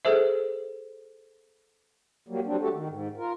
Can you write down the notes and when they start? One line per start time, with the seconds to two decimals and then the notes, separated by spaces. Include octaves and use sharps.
0.05 G#4 A4 C5 E5
2.29 F#3 G3 A#3
2.46 F#3 G3 C4 D4
2.61 A3 F#4 G4 A4
2.73 D#3
2.89 G#2
3.17 F4 A#4